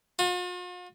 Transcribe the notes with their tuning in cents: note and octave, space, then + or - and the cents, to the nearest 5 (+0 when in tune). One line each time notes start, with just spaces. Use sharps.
F4 +45